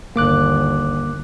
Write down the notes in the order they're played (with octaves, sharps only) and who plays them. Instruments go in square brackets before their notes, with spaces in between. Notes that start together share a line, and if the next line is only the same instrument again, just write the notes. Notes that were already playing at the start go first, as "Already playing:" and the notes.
[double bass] G1 D#2 [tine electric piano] A#3 D6 F#6